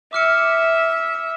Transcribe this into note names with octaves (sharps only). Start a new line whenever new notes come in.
E5 D6 F6 C#7